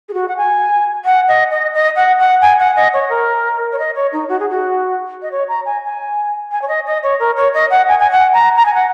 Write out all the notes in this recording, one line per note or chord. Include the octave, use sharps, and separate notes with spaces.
G#4
F#4
F#5
G#5
F#5
D#5
D#5
D#5
F#5
F#5
G#5
F#5
D#5
C#5
A#4
C#5
D#5
C#5
D#4
F#4
G#4
F#4
D#5
C#5
A#5
G#5
G#5
G#5
C#5
D#5
D#5
C#5
A#4
C#5
D#5
F#5
G#5
G#5
F#5
A#5
A#5
G#5
F#5